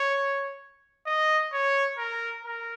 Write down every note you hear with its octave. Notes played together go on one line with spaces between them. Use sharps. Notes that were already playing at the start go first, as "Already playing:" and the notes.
Already playing: C#5
D#5
C#5
A#4
A#4